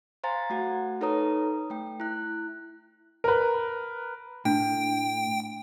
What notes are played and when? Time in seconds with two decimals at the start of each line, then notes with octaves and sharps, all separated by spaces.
0.24 C5 F5 G#5 A#5 C6 A6
0.50 A3 F#4 F#5
1.01 D#4 A4 B4 C#5 A#5 D#6
1.70 A3 G5
2.00 E4 F#6
3.24 A#4 B4
4.45 A2 D4 G5